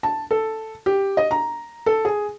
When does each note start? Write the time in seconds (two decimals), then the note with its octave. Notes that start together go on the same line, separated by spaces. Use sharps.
0.03 A5
0.31 A4
0.86 G4
1.17 D#5
1.31 A#5
1.86 A4
2.05 G#4